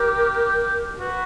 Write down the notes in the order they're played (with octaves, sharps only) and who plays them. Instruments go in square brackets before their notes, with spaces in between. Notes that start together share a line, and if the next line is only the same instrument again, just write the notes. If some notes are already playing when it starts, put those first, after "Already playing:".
Already playing: [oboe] G4 [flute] A#4
[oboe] F#4 [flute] B4